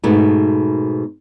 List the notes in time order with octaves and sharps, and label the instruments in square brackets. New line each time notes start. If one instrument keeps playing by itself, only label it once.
[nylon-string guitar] G#2 B2 A3